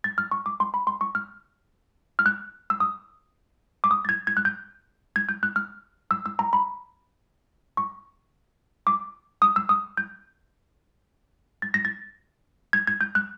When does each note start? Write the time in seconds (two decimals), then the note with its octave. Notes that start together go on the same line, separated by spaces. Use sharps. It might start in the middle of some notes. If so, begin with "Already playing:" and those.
0.04 A6
0.18 F6
0.31 C#6
0.46 D6
0.60 C6
0.74 B5
0.87 C6
1.01 C#6
1.15 F6
2.19 F6
2.26 F#6
2.70 E6
2.80 D#6
3.84 D6
3.91 D#6
4.05 A6
4.09 G#6
4.27 G#6
4.37 F#6
4.45 G6
5.16 G#6
5.29 G6
5.43 F#6
5.56 F6
6.11 E6
6.26 E6
6.39 A#5
6.53 B5
7.77 C#6
8.87 D6
9.42 D#6
9.56 E6
9.69 D#6
9.97 G6
11.62 A6
11.74 A#6
11.85 A6
12.73 G#6
12.87 G#6
13.01 G6
13.15 F#6